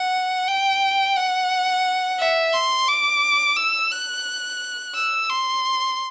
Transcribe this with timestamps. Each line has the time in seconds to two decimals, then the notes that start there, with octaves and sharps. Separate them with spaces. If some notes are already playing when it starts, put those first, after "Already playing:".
Already playing: F#5
0.48 G5
1.16 F#5
2.19 E5
2.53 C6
2.88 D6
3.57 E6
3.92 F#6
4.95 E6
5.29 C6